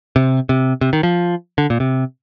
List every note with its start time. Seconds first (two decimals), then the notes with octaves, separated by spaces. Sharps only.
0.16 C3
0.49 C3
0.81 C3
0.93 D#3
1.03 F3
1.58 D3
1.70 A#2
1.80 C3